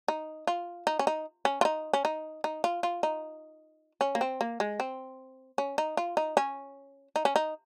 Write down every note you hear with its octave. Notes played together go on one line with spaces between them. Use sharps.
D#4
F4
D#4
C#4
D#4
C#4
F4
D#4
C#4
D#4
D#4
F4
F4
D#4
C#4
A#3
C4
A#3
G#3
C4
C#4
D#4
F4
D#4
C#4
D#4
C#4
D#4